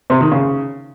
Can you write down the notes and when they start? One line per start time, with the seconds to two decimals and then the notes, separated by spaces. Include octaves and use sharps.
0.10 C3
0.21 D#3
0.32 C#3